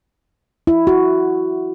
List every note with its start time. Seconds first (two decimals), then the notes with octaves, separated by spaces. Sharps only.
0.67 E4
0.87 F#4